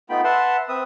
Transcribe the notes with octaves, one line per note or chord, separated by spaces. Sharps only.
A3 B3 D#4 F4 G5 B5
B4 E5 F#5 A5 C6
C4 B4 E5 D#6